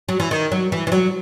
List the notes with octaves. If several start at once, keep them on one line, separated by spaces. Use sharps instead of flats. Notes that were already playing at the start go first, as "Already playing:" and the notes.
F#3
E3
D#3
F#3
E3
E3
F#3